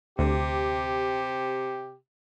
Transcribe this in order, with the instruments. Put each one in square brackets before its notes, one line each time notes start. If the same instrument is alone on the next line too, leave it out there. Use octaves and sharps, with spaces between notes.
[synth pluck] D2 [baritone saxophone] C3 [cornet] G4